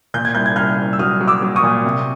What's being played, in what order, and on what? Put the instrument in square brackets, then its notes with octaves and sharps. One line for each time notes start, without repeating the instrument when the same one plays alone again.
[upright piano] A#2 G6
G#6
C2 G6
G#6
C2 F6 G6
C2
E6
F#3 D#6 F6
F#3
D6 E6
F#3
C#6 D#6
A#2
C3